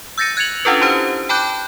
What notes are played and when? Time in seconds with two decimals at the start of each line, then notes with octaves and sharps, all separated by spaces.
0.18 E6 G6 A6 A#6 C#7 D#7
0.37 F#6 G#6 A6 C#7 F7 F#7
0.65 C#4 D4 F4 A4 B4
0.81 E4 G4 C5
1.29 G5 A5 B5 D6 F#6 G6